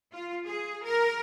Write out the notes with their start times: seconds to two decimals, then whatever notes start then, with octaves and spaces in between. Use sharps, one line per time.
0.12 F4
0.45 G#4
0.85 A#4